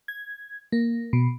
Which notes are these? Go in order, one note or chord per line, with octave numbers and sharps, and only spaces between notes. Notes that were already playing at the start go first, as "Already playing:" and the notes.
G#6
A#3
B2